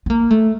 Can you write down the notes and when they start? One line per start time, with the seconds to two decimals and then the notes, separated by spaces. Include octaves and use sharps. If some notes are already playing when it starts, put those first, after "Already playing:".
0.06 B3
0.10 A#3
0.31 A3